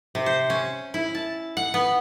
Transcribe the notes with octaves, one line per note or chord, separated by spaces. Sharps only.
C3
C5
C#4
E4
A5
F#5
B3